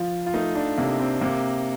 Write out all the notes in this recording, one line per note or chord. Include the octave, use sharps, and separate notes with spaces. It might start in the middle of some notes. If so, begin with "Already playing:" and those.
Already playing: F3 F4
F4
A3 D#4
D4
C3 A#3
C4
C3 A#3